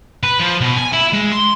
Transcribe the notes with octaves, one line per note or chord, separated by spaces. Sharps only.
B4
F3
B2
G#5
E4
G#3
C6